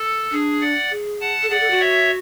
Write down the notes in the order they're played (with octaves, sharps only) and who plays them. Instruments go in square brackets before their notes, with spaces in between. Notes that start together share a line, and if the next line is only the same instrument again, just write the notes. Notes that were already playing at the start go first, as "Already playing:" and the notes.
Already playing: [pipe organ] A4
[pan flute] D4 [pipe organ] G#4
[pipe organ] D5 F#5
[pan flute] G#4
[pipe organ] F#5 A5
[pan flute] A4
[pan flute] G#4 [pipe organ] D5 F#5
[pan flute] A4
F#4
[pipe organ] C#5 E5